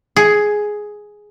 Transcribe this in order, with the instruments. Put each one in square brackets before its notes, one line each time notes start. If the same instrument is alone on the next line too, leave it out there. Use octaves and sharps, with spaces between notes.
[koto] G#4